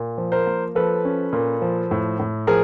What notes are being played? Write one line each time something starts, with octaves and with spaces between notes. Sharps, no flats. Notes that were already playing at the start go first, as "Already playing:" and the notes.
Already playing: A#2
F3
A#4 C5
A#3
F3 A4 B4
C#4
A#2
F3
A2
A2
F3 G#4 A#4